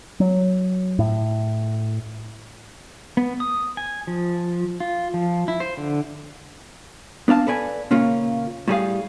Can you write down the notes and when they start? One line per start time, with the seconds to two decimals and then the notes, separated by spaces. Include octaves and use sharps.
0.20 F#3
0.99 A2
3.17 B3
3.40 D#6
3.77 G#5
4.07 F3
4.80 F4
5.14 F3
5.48 E4
5.60 C5
5.77 D3
7.28 B3 D4 F5 A5
7.47 A4 B4 D5 G#5
7.91 A#2 C#3 A#3 C#4 F4
8.68 A2 G3 G#4 F5